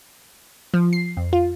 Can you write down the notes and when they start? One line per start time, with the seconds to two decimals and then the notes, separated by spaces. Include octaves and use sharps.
0.74 F3
0.93 C7
1.17 F2
1.33 F4